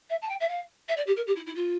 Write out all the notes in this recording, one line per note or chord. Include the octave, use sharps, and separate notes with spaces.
E5
A5
G5
E5
F5
E5
D5
G4
A#4
G4
E4
E4
F4